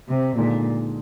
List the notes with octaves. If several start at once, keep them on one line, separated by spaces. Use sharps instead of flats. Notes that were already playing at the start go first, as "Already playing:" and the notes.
C3
A#2 D3 G#3 D#4